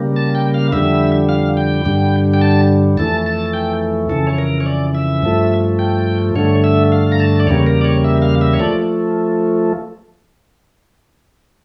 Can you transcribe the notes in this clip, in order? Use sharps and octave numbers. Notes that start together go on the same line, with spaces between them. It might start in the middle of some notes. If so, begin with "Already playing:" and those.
Already playing: C#3 G3 A#3
A5
G5
F5
F2 D3 G3 E5
F5
G5
G2 D3 G3
G5
A5
F2 E3 A3 A5
A5
G5
F2 C#3 E3 A4
C#5
A#4
C#5
D5
E5
G2 F3 A3
G5
G2 D3 A3 C#5
E5
F5
A#5
A5
D5
E2 C#3 G3 A#3 C#5
A#4
D5
C#5
E5
F5
E5
C#5
F3 A3 D5